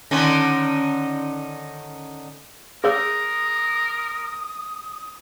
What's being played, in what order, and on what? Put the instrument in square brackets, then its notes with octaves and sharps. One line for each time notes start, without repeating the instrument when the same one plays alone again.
[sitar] D3 D#3 C#4
[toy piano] G#4 C#5 E6 [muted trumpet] A#4 [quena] D#6